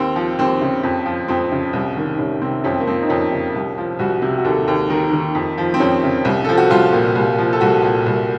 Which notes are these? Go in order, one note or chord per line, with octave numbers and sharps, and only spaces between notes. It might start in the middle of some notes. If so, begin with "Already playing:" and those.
Already playing: D#2 C4
F3
D#2 C4
C#3
F2
F3
F2 C4
C#3
C2
D#3
C2 C#4
C3 C4
F2 C#4
C4
A#3
F3 C4
D#4
F2 C#4
C#3
C2
F3
C2 F#4
C3
F#4
D#2 A4
D#2
D#3 A#4
D#3
F2
F3
C4
F2 C#4
C#3
C2
F3 A4
F#4
C2 F4
A#2
C2
F3
A4
C2 F#4
A#2
C2